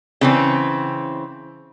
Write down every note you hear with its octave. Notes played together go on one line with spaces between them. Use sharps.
C#3 E3 C4